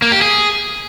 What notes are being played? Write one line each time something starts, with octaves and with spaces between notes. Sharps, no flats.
A#3
G4
G#4